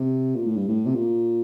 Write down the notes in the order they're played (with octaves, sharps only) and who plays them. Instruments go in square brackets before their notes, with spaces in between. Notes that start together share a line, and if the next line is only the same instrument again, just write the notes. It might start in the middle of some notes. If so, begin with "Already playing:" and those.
Already playing: [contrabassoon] C3
A#2
A2
G2
A2
C3
A#2